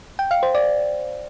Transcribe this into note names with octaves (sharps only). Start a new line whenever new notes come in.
G5
F5
C5
D5